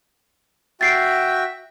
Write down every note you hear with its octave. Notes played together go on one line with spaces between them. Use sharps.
F#4 E5 G5 A6 C7 D7